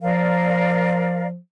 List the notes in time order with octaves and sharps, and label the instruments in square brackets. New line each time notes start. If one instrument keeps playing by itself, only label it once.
[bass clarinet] F3 [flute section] A#4 D5 F5